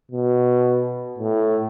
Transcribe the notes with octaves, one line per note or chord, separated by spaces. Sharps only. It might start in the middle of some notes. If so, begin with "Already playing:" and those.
B2
A2